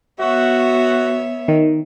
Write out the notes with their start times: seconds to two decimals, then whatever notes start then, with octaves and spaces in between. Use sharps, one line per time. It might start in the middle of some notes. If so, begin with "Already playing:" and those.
0.20 B3 F#4 C#5 E5
1.48 D#3